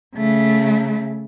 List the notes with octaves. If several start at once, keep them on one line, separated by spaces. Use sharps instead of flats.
C#3 A3